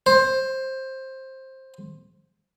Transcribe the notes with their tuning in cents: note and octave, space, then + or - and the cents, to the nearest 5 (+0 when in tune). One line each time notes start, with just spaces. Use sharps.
C5 +15